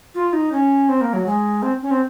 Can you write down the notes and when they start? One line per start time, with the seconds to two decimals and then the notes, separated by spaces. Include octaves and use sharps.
0.15 F4
0.33 D#4
0.52 C#4
0.89 C4
1.01 A#3
1.13 F#3
1.26 G#3
1.62 C4
1.82 C#4
1.91 C4